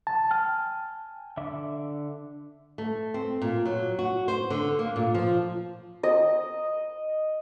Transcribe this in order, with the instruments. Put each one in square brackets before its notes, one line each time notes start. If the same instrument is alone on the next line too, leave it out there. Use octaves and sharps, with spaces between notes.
[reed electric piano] A5
[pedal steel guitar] G5 G#5 F6
D3 E5 D6
[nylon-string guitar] A3
C4
A#2
F#3
F#4
C5
D3
A#3
A#2
F3
[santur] D#5